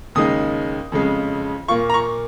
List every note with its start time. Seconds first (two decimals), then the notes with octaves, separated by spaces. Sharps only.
0.15 D#2 C#3 G#3 D#4 D#6
0.92 F2 C#3 G#3
1.68 A#2 A#3 F4 C#6
1.90 A#5
1.94 C#6